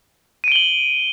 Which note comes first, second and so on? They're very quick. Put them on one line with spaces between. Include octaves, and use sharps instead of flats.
D#7 D7 G7 F#7